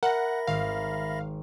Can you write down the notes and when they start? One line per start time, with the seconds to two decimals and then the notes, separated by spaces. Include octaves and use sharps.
0.03 A#4 E5 F#5 B5 A#6
0.47 G#1 F5